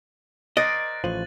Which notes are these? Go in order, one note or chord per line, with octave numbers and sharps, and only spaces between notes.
A#4 C5 D5 D#5 F#6 A6
A1 F3 D#7 F#7